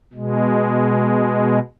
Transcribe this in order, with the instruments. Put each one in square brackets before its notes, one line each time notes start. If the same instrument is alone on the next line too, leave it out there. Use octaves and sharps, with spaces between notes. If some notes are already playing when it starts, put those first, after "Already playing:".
[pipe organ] B2 G#3